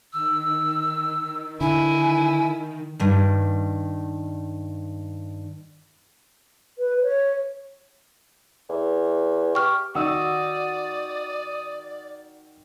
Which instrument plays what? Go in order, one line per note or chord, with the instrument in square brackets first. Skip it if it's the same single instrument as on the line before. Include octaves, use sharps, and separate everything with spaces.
[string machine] D#3 [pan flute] E6
[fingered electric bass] D3 [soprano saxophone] E4 [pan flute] G#5
[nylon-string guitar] G2 D#3
[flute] B4
C#5
[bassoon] E2
[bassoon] G4 [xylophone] C#6 F6
[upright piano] D#3 E6 [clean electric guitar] F#4 [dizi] D5 [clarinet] D#6